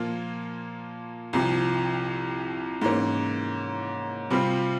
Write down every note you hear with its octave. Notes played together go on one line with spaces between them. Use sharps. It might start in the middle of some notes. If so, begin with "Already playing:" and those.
Already playing: A#2 F3 A#3 F4
C2 C3 F3
G#2 E3 A#3 C#4
C3 G3 C4 F4